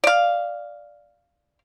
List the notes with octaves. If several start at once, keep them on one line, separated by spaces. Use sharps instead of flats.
D5 F5